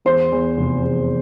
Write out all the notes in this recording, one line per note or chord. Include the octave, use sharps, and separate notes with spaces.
E2 C5 C6
E2
F1
E2